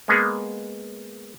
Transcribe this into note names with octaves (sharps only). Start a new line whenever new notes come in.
G#3 A#3 B3 G#4